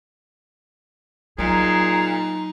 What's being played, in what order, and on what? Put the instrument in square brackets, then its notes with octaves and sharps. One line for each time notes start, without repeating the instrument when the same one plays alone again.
[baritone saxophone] A#2 [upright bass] F#3 [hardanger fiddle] D#4 [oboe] G#4